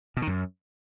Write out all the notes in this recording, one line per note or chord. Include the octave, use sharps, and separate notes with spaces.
B2
D#3
F#2